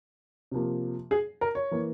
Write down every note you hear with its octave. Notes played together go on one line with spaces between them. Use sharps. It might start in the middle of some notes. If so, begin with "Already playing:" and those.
C3 F3 A#3
G#4
A#4
C#5
E3 A#3